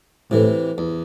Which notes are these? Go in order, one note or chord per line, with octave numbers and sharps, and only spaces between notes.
A2 C3 E3
E2